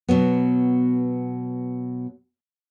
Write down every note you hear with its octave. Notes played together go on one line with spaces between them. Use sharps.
B2 F#3 B3